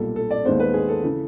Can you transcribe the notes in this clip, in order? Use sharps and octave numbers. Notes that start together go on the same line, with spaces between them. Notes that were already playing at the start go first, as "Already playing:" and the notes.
Already playing: B1 A#2 G3 A4
A4
D5
D#2 D#3 G#3 B3 C5
B4
G#4
A4
C#3 E3